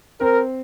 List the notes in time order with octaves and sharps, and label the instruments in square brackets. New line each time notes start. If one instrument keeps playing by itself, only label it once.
[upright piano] C4 [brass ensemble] A#4